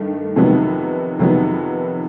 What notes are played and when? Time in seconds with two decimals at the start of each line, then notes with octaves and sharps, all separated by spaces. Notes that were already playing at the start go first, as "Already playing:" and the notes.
Already playing: G2 D#3 A3
0.36 F2 C3 D#3 F#3 B3
1.19 F2 C3 D#3 F#3 B3